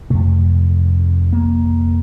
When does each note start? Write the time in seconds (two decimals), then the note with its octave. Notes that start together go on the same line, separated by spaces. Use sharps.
0.10 F2 C3 A3
1.33 A#3